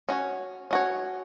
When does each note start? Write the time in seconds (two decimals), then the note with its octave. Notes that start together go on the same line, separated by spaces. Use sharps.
0.09 C#4 F#4 C#5
0.71 C#4 F#4 C#5